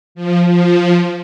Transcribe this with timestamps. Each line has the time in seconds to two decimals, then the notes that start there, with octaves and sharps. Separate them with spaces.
0.15 F3
0.47 F3